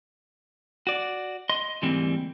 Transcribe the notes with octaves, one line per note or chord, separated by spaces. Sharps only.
F#4 D5
D#5 C6
D2 G#2 E3 G3 A#3 C4